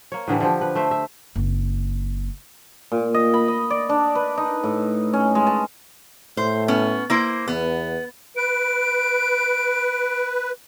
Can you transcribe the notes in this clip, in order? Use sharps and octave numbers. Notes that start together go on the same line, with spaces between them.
A#3 C#5
A2 D3 E3 G3
D3 F3 G4
B4
A3 C5 E5
E5
F#1 C4
A#2
D#5
B5
D#5
D5
D4
B4
D#4
A2
C#4
G#3
A5
A2 C5
B3 C#4
A#3 E4 C5
E2 B3
B4 D7